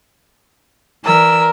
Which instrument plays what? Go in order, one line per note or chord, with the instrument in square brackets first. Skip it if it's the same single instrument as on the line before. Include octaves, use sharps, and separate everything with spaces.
[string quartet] E3 D5 E6 [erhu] A#4